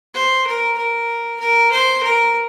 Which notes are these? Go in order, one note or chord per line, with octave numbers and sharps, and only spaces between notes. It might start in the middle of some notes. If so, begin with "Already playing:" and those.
C5
A#4
A#4
A#4
C5
A#4